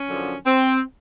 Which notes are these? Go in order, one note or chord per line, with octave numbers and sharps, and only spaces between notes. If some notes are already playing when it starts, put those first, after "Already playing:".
Already playing: C#4
F#2 D3 F3
C4